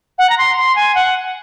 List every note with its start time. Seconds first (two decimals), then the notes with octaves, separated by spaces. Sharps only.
0.18 F#5
0.30 A#5
0.38 C6
0.57 C6
0.76 G#5
0.95 F#5